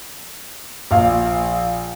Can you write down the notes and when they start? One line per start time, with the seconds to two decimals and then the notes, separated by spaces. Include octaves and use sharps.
0.91 A#1 F5